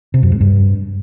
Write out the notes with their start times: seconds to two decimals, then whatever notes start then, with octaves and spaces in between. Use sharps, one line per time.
0.14 C3
0.23 F#2
0.32 G#2
0.41 G2